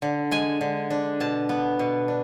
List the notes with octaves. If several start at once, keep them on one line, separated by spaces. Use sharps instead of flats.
D3
G#3 G#5
D3
D4
B2 A5
B3
B2
D4